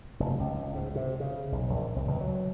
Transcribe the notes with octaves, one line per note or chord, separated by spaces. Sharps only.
F1
C#2
G#2
C3
C#3
B1
A#1
C2
C#2
F#3